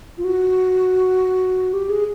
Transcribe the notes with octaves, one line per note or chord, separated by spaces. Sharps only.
F4
F#4
G4
G#4